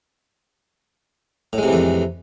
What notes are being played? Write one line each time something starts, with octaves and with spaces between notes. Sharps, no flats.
F2 A2 C3 E3 G#3